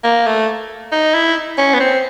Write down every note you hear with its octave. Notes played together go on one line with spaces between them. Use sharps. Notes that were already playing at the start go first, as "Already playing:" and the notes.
A#3
A3
D#4
E4
C#4
B3
C4